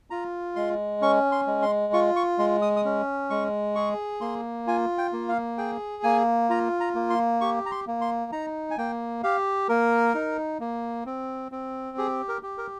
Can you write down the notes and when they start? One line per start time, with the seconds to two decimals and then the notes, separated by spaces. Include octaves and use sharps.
0.10 F4 A#5
0.56 G#3 C6
1.01 C#4 C#6
1.32 C6
1.47 G#3
1.62 C6
1.93 F4 C#6
2.16 C#6
2.38 G#3 C6
2.62 D#6
2.76 D#6
2.85 C#4
3.30 G#3 C#6
3.75 G#4 C#6
4.21 A#3 C6
4.67 F4 G#5
4.98 G5
5.13 A#3
5.29 F5
5.58 G#4 G5
6.03 A#3 G#5
6.50 F4 A#5
6.80 A#5
6.95 A#3
7.10 C6
7.41 G4 C#6
7.66 A#5
7.71 C6
7.87 A#3
8.01 C6
8.32 D#4 A#5
8.71 G#5
8.78 A#3 G5
9.23 G4 F5
9.69 A#3 A#4
10.14 D#4
10.60 A#3
11.06 C4
11.52 C4
11.98 G4 G#4
12.28 A#4
12.43 G4
12.58 A#4